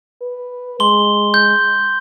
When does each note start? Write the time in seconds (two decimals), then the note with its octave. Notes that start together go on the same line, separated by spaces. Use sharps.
0.21 B4
0.80 G#3 C6 G7
1.34 G6